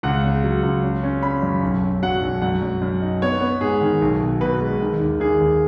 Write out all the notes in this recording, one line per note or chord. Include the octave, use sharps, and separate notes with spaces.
C#2 F#5
C#3
F#3
C#2
C#4
C#4
C#4 B5
F#2
B1
C#4
F#3 F#5
B1
F#2 F#5
F#2
F#2
D#4
B3 C#5
B3
G#2 G#4
D#3
B1
B2
B2 B4
G#3
D#3
D#2
D#2 G#4
D#2